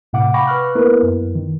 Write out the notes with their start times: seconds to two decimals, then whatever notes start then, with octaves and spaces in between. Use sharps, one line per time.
0.13 A2 C3 F5 F#5 D6
0.34 F5 G5 B5 C#6 D6 A#6
0.47 B4 C#6 F6 F#6
0.75 A#3 B3 E4 A#4 B4
1.03 F#2
1.35 D#3